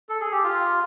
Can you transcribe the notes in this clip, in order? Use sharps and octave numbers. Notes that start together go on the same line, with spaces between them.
A4
G#4
G4
F4